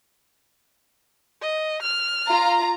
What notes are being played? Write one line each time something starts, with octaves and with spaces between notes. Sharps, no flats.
D#5
F6
F4 A#5